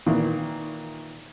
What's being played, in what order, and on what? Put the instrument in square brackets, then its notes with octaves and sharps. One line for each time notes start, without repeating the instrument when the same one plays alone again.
[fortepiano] A#2 D#3 E3